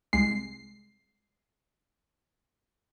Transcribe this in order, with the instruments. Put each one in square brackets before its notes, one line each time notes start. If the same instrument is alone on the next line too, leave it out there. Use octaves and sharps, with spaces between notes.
[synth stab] C2 G#3 C7